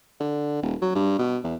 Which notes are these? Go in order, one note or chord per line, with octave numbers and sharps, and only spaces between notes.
D3
D#1
F#3
G2
B2
E2